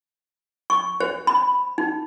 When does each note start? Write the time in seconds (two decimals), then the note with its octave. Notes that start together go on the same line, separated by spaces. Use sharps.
0.70 C#6
1.00 C5
1.27 B5
1.78 D#4